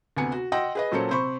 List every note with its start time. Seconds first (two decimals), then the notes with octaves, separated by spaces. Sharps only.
0.17 D2 C3 B3 G#5 C#7
0.32 F#4
0.52 D#5 F#5 G5 C6 E6 A#6
0.75 G#4 B4 D#5
0.92 A#2 F#3 C#4 A4 C5 C#7
1.10 C3 C5 B5 C#6